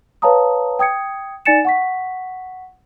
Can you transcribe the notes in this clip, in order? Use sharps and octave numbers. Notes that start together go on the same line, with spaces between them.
B4 C#5 F5 A5 A#5 D#6
G5 D#6 G#6 C#7
D#4 D5 G#5 A6 C#7 E7
F#5 C#6 B6